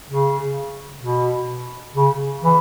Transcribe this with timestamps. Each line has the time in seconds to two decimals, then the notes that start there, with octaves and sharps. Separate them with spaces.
0.10 C#3
1.03 B2
1.96 C#3
2.43 E3